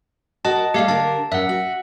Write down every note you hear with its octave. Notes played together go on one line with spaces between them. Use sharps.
F#4 A#4 D#5 A5
G3 A3 G4 F5
D3 A#4 A5
F#2 E5 F#5
F#4